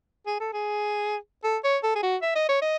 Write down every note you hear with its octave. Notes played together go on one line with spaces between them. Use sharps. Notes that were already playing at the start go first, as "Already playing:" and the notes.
G#4
A4
G#4
A4
C#5
A4
G#4
F#4
E5
D#5
C#5
D#5